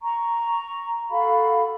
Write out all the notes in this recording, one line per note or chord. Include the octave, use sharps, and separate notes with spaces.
A#5 C#6
F#4 A4 F5 B5